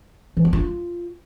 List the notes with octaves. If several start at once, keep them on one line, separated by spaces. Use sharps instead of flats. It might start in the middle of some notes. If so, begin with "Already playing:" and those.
E3
B3
F4